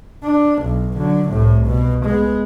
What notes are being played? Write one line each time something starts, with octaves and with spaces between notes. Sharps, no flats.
D4
B1
D3 F#3
C2 A2
B2
G#3 B3